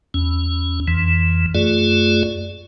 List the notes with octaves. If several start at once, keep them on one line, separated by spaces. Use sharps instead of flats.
E2 C#4
F2 E3
F#2 A3 F4 G#4 D5